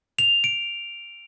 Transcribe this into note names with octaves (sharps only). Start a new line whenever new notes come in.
F7
D7